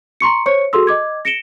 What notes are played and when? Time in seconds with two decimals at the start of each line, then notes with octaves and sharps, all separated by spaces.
0.20 A#5 C6 C#6 C#7
0.46 C5 C#5 C#6 C#7
0.73 F#4 G#4 A4 C6 E6
0.87 D#5 D6 G#6
1.25 A#6 C#7 D7 E7 G7